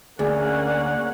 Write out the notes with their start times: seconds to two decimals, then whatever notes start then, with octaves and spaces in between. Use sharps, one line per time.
0.19 D2 A#3 C#4 G#4 D5 F#5 G#5